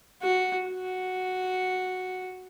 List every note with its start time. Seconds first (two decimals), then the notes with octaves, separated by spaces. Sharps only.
0.23 F#4
0.68 F#4